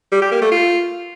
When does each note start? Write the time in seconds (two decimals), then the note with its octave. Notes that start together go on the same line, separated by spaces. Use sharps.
0.12 G3
0.22 G4
0.32 A#3
0.42 A3
0.52 F4